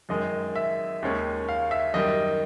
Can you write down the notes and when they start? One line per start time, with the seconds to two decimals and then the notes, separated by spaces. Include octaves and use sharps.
0.09 F#2 D#3 G#3 D#5
0.56 E5
1.03 D#2 D#3 G#3 C#4
1.48 F5
1.71 E5
1.94 F#2 D#3 G3 D#5